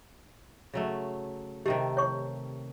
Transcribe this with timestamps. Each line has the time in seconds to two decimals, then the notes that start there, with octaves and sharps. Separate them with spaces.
0.74 C#3 F#3 A3
1.66 C3 D#3 A3 G4
1.97 C#5 C#6